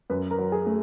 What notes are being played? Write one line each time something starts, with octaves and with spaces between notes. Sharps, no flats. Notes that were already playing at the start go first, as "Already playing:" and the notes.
F#2 B4
A#4
F#3
G#4
A3